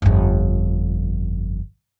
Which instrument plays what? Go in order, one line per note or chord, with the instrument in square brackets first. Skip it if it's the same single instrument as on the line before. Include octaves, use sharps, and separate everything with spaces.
[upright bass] G1 F2